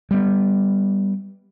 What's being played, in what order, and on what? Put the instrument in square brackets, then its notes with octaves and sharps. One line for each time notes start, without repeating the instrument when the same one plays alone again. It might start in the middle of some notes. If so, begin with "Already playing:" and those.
[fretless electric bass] G3 B3